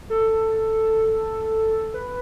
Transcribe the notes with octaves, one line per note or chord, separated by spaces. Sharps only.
A4
B4